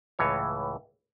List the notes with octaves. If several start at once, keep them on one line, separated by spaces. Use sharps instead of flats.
C#2 A2 E3 C#5